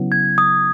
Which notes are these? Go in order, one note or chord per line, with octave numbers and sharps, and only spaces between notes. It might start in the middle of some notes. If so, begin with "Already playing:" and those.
Already playing: C#3 F#3 B3 E4
G#6
D#6